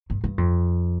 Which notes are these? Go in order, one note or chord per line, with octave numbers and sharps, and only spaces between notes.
G2
G2
F2